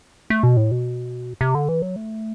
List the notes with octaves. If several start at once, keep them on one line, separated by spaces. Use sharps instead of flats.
A3
B2
A2
B2
C3
D3
E3
F#3
A3